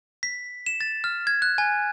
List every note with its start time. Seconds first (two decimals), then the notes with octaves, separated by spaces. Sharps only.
0.23 B6
0.66 E7
0.81 A6
1.04 F6
1.27 G#6
1.42 F#6
1.58 G#5